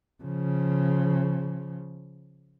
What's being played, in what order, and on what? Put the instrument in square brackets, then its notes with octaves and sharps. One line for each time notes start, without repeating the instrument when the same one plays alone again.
[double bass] C#3 F3